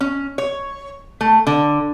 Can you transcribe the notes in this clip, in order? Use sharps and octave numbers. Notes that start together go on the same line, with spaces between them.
C#4
C#5
A3
D3